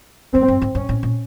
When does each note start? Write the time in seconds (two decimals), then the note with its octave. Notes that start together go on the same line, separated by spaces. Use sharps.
0.34 F#2 C4
0.48 G2
0.62 G#2
0.75 G2 C#4
0.89 A2
1.03 A#2